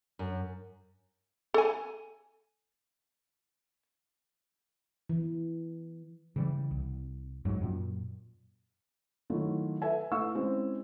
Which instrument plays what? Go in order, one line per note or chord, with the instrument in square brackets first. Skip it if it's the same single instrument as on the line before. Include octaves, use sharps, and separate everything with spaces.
[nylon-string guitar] F#2
[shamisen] A4 G#5
[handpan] E3
[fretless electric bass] C#3 E3 G3
C2
F2 G#2 F#3 G#3
F#2 A#2
[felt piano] D#3 F#3 A3 E4 F4
A4 B4 E5 G#5
A3 E4 B4 F5 C#6 E6
G#3 C4 C#4 E4